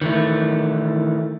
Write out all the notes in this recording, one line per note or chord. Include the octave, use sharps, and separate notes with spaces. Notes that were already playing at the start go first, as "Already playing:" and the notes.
D#3 E3 A3